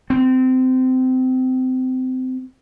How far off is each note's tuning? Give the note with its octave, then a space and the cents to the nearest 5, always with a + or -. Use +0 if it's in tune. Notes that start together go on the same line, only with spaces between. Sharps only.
C4 -25